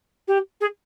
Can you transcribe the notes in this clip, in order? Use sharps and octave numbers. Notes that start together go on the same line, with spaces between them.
G4
G#4